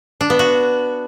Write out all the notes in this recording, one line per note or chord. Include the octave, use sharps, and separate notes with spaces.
D4
B3
F#4